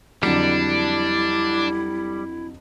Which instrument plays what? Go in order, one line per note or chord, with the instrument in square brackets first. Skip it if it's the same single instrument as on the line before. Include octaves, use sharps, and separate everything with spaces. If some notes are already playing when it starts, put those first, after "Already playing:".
[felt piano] F2 D3 F#3 [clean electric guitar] G3 [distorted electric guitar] D4 [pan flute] E4